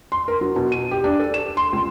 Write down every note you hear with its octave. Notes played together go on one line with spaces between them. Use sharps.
C6
A#4
F#3
B2
D#7
G4
D4
A4
E7
C6
C#2